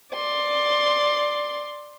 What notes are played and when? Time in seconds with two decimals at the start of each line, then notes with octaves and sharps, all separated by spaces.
0.13 D5 C6